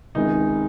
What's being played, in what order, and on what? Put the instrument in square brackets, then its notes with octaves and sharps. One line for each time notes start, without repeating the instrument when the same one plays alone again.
[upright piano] C#2 C3 D#3 G#3 D#4